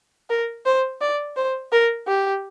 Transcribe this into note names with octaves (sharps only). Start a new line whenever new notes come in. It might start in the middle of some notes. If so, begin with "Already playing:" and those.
A#4
C5
D5
C5
A#4
G4